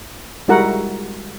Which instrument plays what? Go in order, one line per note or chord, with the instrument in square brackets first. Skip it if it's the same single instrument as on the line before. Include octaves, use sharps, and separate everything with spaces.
[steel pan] G3 G#3 E4 F#4 A#4 F#5